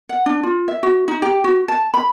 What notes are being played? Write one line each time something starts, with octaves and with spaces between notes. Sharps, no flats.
F#5
D4
F4
E5
F#4
D#4
G4
F#4
A5
B5